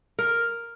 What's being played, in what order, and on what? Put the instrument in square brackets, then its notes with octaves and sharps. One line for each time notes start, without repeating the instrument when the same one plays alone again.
[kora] A#4